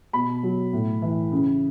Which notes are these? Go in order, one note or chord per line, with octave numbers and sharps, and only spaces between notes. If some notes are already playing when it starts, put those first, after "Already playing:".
B2 B5
F#3
A2
E3
C#3